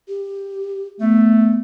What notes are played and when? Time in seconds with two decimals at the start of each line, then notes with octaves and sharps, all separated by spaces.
0.08 G4
1.01 A3 B3